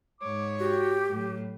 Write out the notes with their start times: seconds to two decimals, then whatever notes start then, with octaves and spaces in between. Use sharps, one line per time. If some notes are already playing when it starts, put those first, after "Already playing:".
0.21 G#2 C#5 D6
0.60 F#4 G4
1.10 A2 F#3